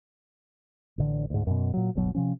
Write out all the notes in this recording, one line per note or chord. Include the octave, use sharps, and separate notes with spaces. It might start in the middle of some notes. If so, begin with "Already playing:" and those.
A1 D3
D2 G#2
F#2 B2
A#2 F#3
D1 G1 B2 F#3
C3 F3 C#4